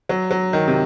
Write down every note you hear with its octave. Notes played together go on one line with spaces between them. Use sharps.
F#3
F#3
D#3
C3